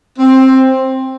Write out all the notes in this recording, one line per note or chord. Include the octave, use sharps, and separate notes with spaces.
C4